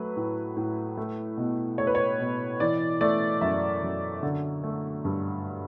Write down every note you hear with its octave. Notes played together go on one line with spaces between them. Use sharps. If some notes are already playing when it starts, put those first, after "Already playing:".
Already playing: F#3 A3 B4
A2
A2
A3
B2
A3 C#5
B4
C#5
B2
E3 D5
A3 D5
F#2 E5
F#2
D3
A3
G2